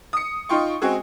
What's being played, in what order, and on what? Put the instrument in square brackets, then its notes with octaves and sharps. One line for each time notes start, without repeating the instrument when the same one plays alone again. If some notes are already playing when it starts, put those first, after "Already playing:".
[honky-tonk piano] D#6 C#7
D#4 F4 G5 C6 C#6
G#3 C4 F#4 G#4